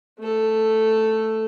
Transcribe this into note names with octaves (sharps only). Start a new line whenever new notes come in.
A3 A4